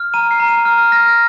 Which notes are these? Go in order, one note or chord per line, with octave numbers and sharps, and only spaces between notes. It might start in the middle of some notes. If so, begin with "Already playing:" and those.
Already playing: F6
A#5 D#7
C7
A#5
D#7
F6
F6 A#6